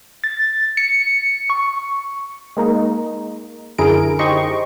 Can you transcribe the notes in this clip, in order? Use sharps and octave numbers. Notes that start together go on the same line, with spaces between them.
A6
C#7
C#6
G#3 A#3 D#4
F#2 D3 E4 G#4 A#4 D7
D#4 G4 C5 D#5 C#6